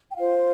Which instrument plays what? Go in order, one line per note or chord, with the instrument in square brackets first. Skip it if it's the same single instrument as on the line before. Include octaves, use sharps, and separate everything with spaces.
[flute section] G5
F4 C5 F5